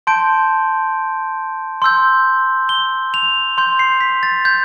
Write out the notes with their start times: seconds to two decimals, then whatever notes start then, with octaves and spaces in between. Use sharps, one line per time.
0.07 A5 C6 G6 D7
1.82 C6 E6 G6
2.69 G7
3.14 F7
3.58 C6 G6
3.79 C7
4.01 B6
4.23 A6
4.45 G6